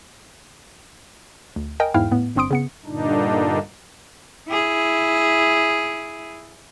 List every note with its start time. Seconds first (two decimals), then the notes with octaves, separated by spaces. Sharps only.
1.56 D2
1.80 A#4 D#5 G5 G#5
1.94 E2 G#2 E4 F5 G5 F6
2.11 A2 B3
2.36 G1 G2 C4 C6 D#6 D7
2.51 C#3 B3 C#7
2.85 G2 A#2 D3 D4 D#4
4.49 E4 G#4